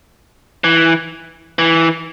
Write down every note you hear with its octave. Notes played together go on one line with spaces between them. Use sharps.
E3
E3